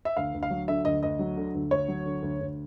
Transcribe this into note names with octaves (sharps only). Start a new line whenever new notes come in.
E5
D2 F5
D2
F5
F#3
D3 E5
D2 D#5
D2 D#5
F#3
D3
D2
D2 C#5
F#3
D3
D2
D2